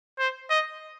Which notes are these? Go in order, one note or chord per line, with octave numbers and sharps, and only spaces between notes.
C5
D#5